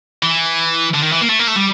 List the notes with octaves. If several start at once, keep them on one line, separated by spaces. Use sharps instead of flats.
E3
D3
D#3
E3
A#3
A3
A#3
A3
G3